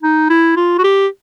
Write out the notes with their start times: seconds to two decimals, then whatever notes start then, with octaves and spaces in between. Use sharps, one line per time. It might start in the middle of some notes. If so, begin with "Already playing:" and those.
0.03 D#4
0.30 E4
0.56 F4
0.79 F#4
0.84 G4